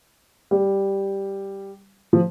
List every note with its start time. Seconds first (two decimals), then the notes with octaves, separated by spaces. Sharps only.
0.51 G3
2.13 F3